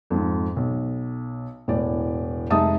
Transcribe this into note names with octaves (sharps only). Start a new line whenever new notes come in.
F2 G#2
B1
E1 A2 D5
F1 G#3 D#4 E5 A5 D#6